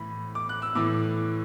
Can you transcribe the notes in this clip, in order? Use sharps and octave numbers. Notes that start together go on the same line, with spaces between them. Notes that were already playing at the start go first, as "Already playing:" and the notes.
Already playing: A2 E3 B5
D6
F#6
E6
A2 E3 D6